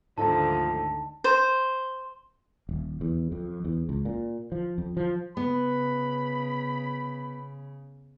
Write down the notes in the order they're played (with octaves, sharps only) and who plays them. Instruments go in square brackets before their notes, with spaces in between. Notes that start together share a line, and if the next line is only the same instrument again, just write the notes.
[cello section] D2 D3 D#3 [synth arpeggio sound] G#2 D#4 A4 [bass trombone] F3 [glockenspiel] A5
[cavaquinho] C5
[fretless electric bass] D#1
E2
F2
E2
C#2
A#2
F3
F2
F3
[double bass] C#3 [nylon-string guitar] B3 [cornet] B5